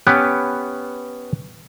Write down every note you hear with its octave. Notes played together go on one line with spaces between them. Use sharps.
B3 C#4 G4 B4